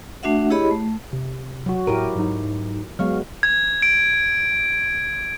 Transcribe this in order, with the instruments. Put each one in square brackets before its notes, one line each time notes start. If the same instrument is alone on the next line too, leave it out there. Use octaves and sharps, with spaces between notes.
[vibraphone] A3 D4 F#4 E5 F#5
E4 G4 G#4 C#5 D#5 B5
A3
[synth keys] C3
[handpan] F#3 F#4
[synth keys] A2 D7 D#7 [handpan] E4 G4 A#4
[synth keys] G#2 F#3 D#4
[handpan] F#3 G#3 B3 [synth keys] F5 C#6 F6
[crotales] G#6
D7